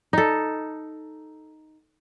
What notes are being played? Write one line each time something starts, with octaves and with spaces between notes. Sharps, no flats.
D#4 A4